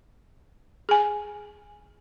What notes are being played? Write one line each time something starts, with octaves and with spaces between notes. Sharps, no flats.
G#4 G#5